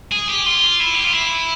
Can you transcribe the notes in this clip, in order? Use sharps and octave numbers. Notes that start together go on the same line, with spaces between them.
G#4
G4
F4
E4
G4
F4
E4